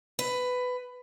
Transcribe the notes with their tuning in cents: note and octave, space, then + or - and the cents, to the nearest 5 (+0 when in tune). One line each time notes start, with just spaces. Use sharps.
B4 +15